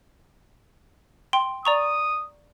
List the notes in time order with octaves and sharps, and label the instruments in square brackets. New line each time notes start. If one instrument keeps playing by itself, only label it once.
[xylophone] G5 C6
[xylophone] D5 A#5 C#6 [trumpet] D#6